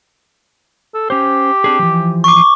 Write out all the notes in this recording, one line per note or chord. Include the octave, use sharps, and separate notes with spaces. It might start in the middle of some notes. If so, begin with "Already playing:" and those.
A4
C#4 G4 C5
C4 D4 G#4
E3 F3
C#6 D6